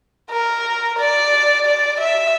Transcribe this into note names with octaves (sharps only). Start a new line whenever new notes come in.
A#4
D5
D5
E5